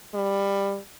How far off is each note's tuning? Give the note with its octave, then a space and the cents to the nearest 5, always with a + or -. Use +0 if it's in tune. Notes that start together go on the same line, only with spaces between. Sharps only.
G3 +15